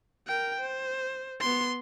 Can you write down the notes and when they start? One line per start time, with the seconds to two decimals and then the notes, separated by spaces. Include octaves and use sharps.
0.27 A#4 G5
0.60 C5
1.40 B3 C6